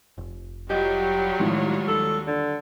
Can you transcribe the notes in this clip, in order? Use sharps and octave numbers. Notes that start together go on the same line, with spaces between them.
F1
F#3 G3 F4 G4 D#5
A2 D#3 F3 G#3
D#2 A4
D3